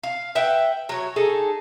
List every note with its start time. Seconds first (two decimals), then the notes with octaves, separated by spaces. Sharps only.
0.03 F5
0.35 B4 E5 F#5 G5
0.89 F#3 C#5
1.16 D#4 G#4 A4